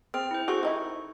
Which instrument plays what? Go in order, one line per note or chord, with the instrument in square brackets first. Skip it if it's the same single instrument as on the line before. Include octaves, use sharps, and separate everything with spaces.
[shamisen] C4 [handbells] G#4 F6
[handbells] E4 C5
[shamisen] F#4 G#4 C5 [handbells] A4 C#6
[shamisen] D#3 D#4 E4